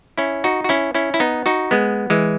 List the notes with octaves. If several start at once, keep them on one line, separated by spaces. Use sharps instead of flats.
C#4 E4
D#4 F#4
F#4
C#4 E4
C#4 E4
E4
B3 D#4
D#4 F#4
G#3 B3
E3 G#3